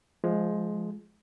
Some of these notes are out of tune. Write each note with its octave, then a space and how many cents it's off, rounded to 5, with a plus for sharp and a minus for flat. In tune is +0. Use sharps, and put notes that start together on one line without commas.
F3 +0 G#3 +15